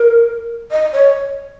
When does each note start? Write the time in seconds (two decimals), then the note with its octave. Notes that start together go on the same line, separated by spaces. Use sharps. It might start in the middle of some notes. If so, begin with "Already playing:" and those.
Already playing: A#4
0.71 D#5
0.93 C#5